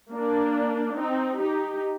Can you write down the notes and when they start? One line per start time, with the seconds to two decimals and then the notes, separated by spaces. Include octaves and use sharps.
0.13 A#3 D4
0.97 C4 D#4
1.40 D#4 G4